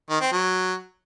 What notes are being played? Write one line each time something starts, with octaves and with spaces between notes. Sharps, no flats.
D#3
C4
F#3